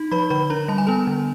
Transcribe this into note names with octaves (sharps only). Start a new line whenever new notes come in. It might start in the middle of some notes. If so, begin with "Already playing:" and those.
Already playing: D#4
F3 B4 B5
D3 B4 B5
D4 A#4 A#5
G3 A5
G#5
B3 A4 A5
D3